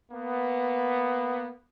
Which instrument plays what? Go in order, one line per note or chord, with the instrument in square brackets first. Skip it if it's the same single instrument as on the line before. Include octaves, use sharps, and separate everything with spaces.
[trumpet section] A#3 B3